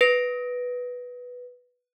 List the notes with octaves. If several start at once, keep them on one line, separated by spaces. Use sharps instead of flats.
B4 A#6 D7